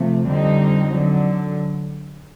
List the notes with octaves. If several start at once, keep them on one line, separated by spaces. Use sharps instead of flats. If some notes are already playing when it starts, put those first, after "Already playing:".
Already playing: C3 F3 A3
F2 D3 G3 C4 D#4
D3 F#3